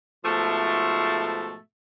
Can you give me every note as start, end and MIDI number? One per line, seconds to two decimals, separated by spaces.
0.24 1.57 44
0.24 1.57 47
0.24 1.57 53
0.24 1.57 57